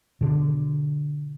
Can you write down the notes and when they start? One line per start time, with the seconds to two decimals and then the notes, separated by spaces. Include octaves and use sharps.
0.21 B2 D3